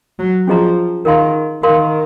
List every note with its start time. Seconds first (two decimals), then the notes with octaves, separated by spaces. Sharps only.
0.19 F#3
0.47 F3 C#4 G#4 D#5 A#5
1.05 D#3 A#4 F5 C6
1.63 D#3 A#4 F5 C6